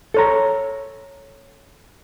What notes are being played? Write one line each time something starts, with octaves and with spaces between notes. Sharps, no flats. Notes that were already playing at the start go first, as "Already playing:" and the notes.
A4 C#5 A#5